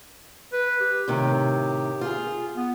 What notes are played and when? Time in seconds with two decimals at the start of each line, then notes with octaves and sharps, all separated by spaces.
0.53 B4
0.81 G4
1.08 A2 C3 D#3
2.01 F4 G#4
2.57 B3